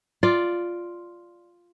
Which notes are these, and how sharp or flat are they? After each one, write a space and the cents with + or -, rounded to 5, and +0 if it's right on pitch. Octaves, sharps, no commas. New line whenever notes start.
F4 +0 D5 +0